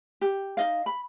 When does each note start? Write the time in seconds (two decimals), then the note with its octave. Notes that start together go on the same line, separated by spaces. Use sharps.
0.21 G4
0.57 D#4 D#5 F5
0.86 B5